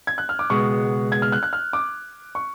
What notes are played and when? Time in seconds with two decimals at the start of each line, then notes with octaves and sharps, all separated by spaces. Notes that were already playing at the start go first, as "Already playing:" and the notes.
0.07 G#6
0.18 F#6
0.29 F6
0.39 D6
0.50 C#2 B2 G#3 B3 C#6
1.12 G#6
1.22 F6
1.32 F#6
1.43 F#6
1.53 F6
1.73 D6
2.35 C#6